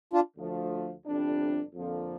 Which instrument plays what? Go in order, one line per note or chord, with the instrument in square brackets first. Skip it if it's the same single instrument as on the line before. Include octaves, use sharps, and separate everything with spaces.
[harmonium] D4 F4
[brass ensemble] D2 D3 F3 A3
G1 F2 C3 G3 D4
F2 D3 F3 A#3